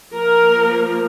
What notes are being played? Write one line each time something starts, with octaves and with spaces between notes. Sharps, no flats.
F3 A#3 A#4